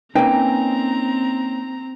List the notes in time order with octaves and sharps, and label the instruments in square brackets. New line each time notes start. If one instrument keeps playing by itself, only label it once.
[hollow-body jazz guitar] A#3 C#4 D#4 [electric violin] C4 A#5 [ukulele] B4 G5 G#5